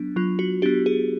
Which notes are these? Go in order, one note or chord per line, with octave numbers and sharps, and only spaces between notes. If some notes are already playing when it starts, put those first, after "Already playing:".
Already playing: F#3 B3 D4
F#3 F4
F#4
B3 D4 G4
G#4